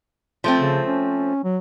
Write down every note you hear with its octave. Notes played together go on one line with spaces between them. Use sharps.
F3 A3 C4
C#3
C#4
F#3